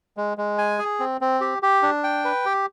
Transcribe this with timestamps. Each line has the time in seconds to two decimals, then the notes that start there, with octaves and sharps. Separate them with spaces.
0.17 G#3
0.38 G#3
0.58 G#5
0.79 G#4
1.00 C4
1.21 C4
1.41 G4
1.63 G4
1.82 D4
2.04 G5
2.25 B4
2.45 G4